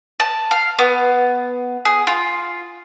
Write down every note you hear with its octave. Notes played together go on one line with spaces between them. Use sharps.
A5
F5
B3
G#4
F4